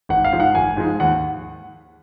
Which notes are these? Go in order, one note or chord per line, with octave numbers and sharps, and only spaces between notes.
G#1 F#5
F5
G#2 F3 G#3
F#5
G#1 G#5
G#2 F3 G#3
D#2 F#5